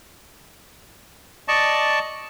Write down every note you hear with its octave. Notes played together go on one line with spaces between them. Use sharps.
D5 D#5 A5 C#6